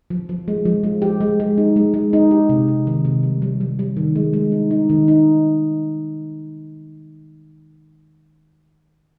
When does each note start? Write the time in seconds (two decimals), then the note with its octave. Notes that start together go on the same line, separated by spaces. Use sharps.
0.10 F3
0.29 F3
0.48 G#3
0.65 F3
0.83 G#3
1.02 G4
1.21 G#3
1.40 G#3
1.58 D#4
1.76 G#3
1.94 G#3
2.13 D#4
2.31 G4
2.49 C3
2.68 C3
2.87 D#3
3.05 C3
3.23 G3
3.42 G3
3.61 G3
3.79 G3
3.97 D#3
4.16 G#3
4.33 G#3
4.52 D#4
4.71 D#4
4.89 D#3
5.08 D#4